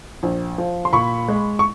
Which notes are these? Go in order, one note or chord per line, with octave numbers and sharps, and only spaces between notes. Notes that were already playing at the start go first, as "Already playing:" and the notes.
A#1
F3
C6
A#2 B5 C#6
G#3
C#6